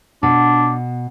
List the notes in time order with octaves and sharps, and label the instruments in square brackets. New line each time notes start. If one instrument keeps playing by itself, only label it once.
[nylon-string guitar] B2 [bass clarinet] D4